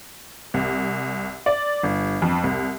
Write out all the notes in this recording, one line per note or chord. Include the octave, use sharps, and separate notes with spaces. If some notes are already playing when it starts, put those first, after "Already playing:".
C2
D5
G1
F2
C2